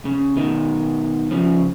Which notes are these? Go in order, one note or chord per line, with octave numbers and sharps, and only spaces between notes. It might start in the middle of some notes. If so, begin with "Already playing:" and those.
C#3
B2 D#3
C#3 F3